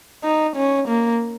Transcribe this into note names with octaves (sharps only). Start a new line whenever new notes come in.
D#4
C#4
A#3